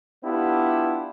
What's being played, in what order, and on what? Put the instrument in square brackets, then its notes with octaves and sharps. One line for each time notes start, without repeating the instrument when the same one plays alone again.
[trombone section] B3 D4 E4 F4 G4